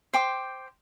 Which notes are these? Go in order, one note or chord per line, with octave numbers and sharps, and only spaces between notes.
C5 G5 D6